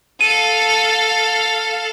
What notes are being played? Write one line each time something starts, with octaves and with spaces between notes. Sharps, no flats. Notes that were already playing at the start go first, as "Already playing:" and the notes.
A4 F5 D#7